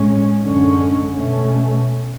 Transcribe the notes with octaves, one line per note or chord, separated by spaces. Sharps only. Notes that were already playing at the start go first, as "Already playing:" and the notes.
Already playing: A2 G#3 C#4
F#2 D3 G#3 C#4
B2 A3 C#4